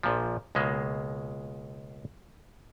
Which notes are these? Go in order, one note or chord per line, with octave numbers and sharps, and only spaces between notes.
A#1 A#2 F3
C#2 B2 G#3 A#3